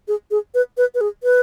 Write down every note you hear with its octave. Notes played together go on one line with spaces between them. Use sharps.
G#4
G#4
B4
B4
B4
G#4
B4